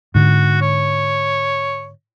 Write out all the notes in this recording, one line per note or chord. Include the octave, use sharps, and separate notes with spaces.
G#2 D3 F#4
C#5